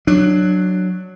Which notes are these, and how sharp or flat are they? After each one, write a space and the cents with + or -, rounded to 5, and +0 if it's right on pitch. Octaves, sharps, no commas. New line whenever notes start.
F#3 +0 D4 +20